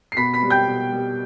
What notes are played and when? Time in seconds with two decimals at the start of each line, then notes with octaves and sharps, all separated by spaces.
0.12 C7
0.17 B2 B5 B6
0.34 B5 B6
0.42 G3
0.50 G5 G6
0.67 B2
0.92 G3